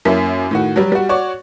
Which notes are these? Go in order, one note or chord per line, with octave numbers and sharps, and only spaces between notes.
F#2 A#3 C#4 E4 B6
A2 D#3 F#4
F#3 G3
G3 F#4
F#4 C#5 D5 C#6